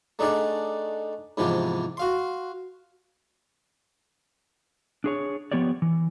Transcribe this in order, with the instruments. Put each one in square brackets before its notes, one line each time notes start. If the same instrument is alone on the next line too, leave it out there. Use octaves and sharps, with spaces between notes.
[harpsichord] A3 D4 D#4 G#4 D5 F#5
G#2 C3 E3 F3 B3 G4
F#4 F5 C6
[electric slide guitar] D4 G#4 C#5
F3 B3 G4 C#5 D5
E3